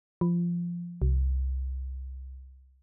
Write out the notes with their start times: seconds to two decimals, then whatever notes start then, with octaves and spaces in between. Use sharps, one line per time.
0.21 F3
1.02 C2